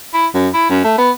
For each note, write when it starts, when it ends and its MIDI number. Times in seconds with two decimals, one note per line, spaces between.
0.14 0.26 64
0.35 0.49 42
0.54 0.70 64
0.70 0.82 42
0.84 0.95 57
0.98 1.10 59